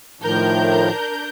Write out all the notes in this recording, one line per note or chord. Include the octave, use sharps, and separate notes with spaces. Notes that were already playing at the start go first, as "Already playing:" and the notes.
A2 D#3 F3 D4 A#4 G6